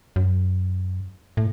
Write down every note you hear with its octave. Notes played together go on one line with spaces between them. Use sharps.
F#2
A2